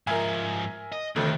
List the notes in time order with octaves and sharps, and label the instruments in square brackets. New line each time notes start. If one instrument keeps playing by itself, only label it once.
[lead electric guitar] G#2 F3 [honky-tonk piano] A#4 E5 G#5
[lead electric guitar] D#5
[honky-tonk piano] F1 D2 D3 [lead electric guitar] D#3